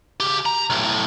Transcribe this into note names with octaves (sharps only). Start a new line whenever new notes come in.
C#3 G4
A#5
B1 A2